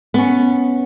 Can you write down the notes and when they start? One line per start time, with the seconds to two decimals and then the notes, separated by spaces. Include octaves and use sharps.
0.14 B3 C#4